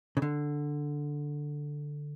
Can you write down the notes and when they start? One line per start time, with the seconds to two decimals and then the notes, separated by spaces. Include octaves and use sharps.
0.17 C#3
0.22 D3